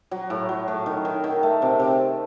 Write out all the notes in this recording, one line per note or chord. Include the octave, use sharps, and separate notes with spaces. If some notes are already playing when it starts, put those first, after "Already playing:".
F#3
A2
F#3
A2
D#3
D#3
D#3
A3
C3
C3